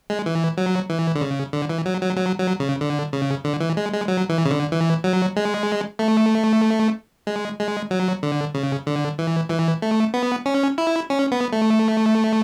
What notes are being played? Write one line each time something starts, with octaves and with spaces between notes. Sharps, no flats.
G#3
E3
F#3
E3
D3
C#3
D3
E3
F#3
F#3
F#3
F#3
C#3
D3
C#3
D3
E3
G#3
G#3
F#3
E3
C#3
D3
E3
F#3
G#3
A3
G#3
G#3
F#3
D3
C#3
D3
E3
E3
A3
B3
C#4
E4
C#4
B3
A3